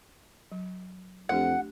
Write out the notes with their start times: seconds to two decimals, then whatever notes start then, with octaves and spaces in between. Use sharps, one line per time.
0.52 F#3
1.29 F2 A3 D4 G4 F#5